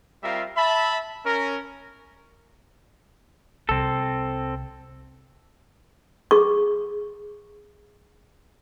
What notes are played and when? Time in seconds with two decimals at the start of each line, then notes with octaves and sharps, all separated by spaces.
0.23 G3 C4 F4 A#4 E5 F5
0.57 E5 A5 B5
1.26 C#4 A#4
3.69 C2 C4 A4
6.31 G#4 C#6